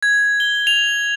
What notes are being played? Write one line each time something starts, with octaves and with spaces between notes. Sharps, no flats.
G#6
G7
F7